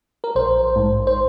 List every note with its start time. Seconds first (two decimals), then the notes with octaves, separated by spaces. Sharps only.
0.24 A#4
0.35 A#1 C5
0.76 G#2
1.07 C5